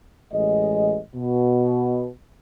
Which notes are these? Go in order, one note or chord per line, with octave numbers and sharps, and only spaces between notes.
A1 G#3 D#5
B2